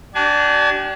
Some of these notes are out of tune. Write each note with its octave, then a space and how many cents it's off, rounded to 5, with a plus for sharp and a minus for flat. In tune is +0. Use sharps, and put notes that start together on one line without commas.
D4 +0 G4 -35 G#5 +30